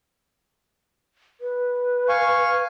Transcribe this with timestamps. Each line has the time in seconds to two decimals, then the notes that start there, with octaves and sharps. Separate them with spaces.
1.41 B4
2.08 F5 G#5 C#6